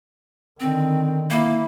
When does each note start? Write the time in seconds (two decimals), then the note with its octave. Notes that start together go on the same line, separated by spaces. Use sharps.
0.60 D3 D#3 C4
1.30 A#3 E4